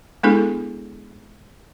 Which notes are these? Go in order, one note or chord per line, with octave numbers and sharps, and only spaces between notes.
G#3 B3 D4 E4 G#4 A4